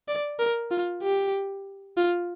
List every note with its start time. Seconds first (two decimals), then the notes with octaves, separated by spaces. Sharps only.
0.08 D5
0.39 A#4
0.71 F4
1.02 G4
1.97 F4